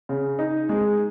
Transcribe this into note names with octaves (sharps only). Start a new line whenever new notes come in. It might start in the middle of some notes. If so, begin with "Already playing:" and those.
C#3
D#4
G#3